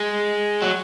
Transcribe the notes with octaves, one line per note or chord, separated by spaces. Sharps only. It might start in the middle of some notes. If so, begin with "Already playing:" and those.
Already playing: G#3
F#3